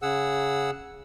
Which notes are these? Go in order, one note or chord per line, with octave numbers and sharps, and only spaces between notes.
C#3 G#4 F#5 E6